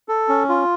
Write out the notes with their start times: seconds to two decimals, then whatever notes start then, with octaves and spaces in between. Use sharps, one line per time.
0.08 A4
0.29 C#4
0.49 F4